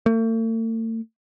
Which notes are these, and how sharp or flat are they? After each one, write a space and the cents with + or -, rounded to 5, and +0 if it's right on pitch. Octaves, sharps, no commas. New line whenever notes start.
A3 +45